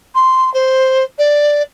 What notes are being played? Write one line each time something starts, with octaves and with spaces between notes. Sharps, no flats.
C6
C5
D5